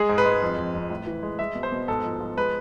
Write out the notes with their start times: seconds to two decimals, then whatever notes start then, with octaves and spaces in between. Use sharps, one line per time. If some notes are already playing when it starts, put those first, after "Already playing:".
Already playing: G#3 G#4
0.09 G#2
0.18 B4
0.26 G#3
0.42 F2
0.57 F2
0.75 F2
0.90 A2
1.06 E3
1.23 G#3
1.39 G#3 E5
1.55 B2
1.63 C5
1.72 B2
1.88 G#2 A4
2.04 F3
2.20 F3
2.37 G#3 B4